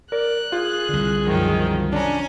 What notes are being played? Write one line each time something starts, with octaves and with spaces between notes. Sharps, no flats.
A#4 D5 F#6
F4 G#4
C2 D3
F#2 D#3 F3
C#4 D4 G#5 A#5